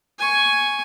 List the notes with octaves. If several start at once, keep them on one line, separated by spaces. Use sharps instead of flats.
G#5 C#6